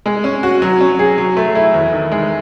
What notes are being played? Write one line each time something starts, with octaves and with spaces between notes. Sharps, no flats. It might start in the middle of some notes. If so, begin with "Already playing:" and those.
G#3
C#4
F#4
F#3
C#4
G#4
F#3
A3
E4
E2
D#3
G#3